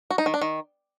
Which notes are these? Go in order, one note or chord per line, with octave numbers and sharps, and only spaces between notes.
F#4
D#4
D#3
D4
D#3